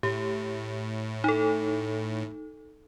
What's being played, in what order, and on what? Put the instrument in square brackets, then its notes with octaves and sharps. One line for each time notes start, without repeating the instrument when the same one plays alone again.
[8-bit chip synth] A2 [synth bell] G4
[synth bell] D#4 A4